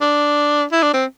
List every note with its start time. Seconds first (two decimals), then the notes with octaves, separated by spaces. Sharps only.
0.01 D4
0.72 E4
0.83 D4
0.94 C4